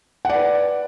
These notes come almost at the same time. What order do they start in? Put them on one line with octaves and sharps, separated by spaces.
F#5 D5 B4